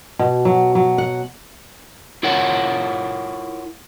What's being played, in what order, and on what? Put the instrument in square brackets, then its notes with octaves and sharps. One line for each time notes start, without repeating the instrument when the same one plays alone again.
[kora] B2
F#3
F#3
F#5
[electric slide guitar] E4 F4 A#4 C#5 F#5